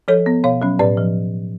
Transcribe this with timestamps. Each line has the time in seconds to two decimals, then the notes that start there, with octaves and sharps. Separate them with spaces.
0.08 F3 A4 C#5
0.26 B3
0.44 B2 C#5 F5
0.62 F#3 C#4
0.79 A2 B4 D5
0.97 F3